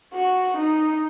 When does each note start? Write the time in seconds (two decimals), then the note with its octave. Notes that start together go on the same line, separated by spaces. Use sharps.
0.13 F#4
0.57 D#4